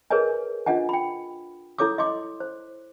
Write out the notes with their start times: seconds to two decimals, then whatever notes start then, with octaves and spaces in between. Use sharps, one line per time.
0.10 G#4 A#4 B4 C#5 D#5 G#5
0.66 D4 F4 D#5 F#5 G#5
0.89 G5 B5
1.79 E4 A4 C#5 D6 D#6
1.98 D#5 C6 D6
2.40 C5